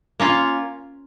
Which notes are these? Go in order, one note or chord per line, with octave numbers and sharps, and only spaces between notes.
A#3 C#4 F4